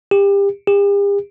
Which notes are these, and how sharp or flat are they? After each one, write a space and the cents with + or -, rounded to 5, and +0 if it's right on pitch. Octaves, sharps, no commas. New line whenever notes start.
G4 +30
G4 +45